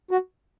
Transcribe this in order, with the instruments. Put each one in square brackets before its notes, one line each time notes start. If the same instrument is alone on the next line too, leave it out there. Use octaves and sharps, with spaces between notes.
[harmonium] F#4